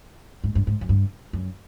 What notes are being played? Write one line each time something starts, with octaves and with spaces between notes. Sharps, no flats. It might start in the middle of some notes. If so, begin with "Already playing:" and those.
G#2
G2
G#2
F#2
G2
F#2